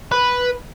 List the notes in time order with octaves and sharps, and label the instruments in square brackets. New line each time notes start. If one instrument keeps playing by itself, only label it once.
[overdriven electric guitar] B4